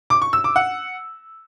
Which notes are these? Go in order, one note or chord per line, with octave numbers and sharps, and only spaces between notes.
D6
C#6
E6
D6
F#5